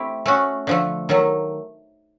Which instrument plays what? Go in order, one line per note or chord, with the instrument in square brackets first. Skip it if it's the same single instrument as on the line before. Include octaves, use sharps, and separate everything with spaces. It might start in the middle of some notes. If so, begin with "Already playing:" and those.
Already playing: [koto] A3 C4 E4 G4
A3 C#4 F#4
D3 F3 A3
D#3 F#3 A3